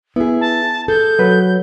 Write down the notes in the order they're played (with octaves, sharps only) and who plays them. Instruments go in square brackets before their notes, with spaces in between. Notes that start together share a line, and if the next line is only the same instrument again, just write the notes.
[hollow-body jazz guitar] B3 [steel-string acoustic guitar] E4 G#4
[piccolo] A5
[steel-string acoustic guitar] G#4 A4 [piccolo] G6
[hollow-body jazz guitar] F#3 B4